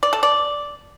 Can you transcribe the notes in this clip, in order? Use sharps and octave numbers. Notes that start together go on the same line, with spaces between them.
D5
A4
D5